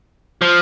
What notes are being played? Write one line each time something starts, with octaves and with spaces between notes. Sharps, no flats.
F3